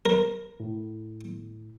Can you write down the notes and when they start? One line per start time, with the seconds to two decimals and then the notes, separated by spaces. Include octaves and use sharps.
0.06 A#4
0.60 A2